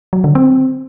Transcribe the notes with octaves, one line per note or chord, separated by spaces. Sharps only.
F#3
D3
C4